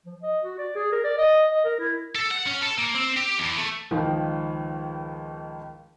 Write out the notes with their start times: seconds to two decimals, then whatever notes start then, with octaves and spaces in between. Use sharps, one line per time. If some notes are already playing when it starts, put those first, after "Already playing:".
0.06 F3
0.22 D#5
0.44 F#4
0.58 D5
0.76 G#4
0.92 A#4
1.04 D5
1.18 D#5
1.52 D#5
1.64 A#4
1.80 E4
2.15 A4
2.31 F#5
2.47 C#4
2.62 A4
2.78 A#3
2.95 C4
3.16 G4
3.38 E2
3.57 A3
3.91 C#2 D#3 F3